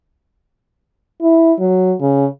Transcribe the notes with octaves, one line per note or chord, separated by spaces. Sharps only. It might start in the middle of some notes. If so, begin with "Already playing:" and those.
E4
F#3
C#3